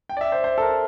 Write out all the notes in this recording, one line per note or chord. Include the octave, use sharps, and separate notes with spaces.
G5
D5
E5
C5
C5
A4
A#4